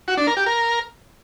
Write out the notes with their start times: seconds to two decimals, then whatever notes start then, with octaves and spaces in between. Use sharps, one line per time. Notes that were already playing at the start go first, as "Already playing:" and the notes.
0.08 F#4
0.17 D4
0.27 A#4
0.37 G4
0.46 A#4